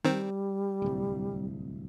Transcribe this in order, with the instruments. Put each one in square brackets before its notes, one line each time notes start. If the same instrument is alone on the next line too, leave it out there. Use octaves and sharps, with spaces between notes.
[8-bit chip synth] D#3 C4 [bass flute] G3
[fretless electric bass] D1 C2